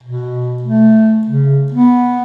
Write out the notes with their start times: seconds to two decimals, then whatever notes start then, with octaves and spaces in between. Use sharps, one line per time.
0.03 B2
0.62 A3
1.27 C#3
1.72 B3